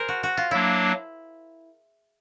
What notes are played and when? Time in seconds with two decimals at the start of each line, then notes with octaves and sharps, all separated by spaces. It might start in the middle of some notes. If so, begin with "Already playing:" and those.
Already playing: G#4 A#4 C5
0.08 F#4
0.23 F#4
0.37 F4
0.51 F#3 A#3 D4 E4